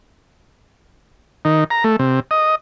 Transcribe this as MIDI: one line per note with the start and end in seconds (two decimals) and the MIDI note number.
1.45 1.64 51
1.70 1.84 82
1.84 1.96 57
1.99 2.20 48
2.31 2.55 75